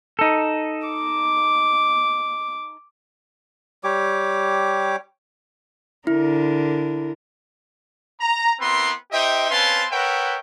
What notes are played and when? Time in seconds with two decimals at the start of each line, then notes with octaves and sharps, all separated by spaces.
0.19 D#4 A4
0.87 D6
3.84 G3 G4 C#5 D6
6.07 D3 E4 A#4
8.20 A#5
8.60 B3 C4 E4 A#4 B4 C6
9.11 D#4 G4 C5 D#5 E5 G5
9.51 C4 C#4 B4 F5 A5 C6
9.90 A#4 B4 C#5 E5 F#5 G5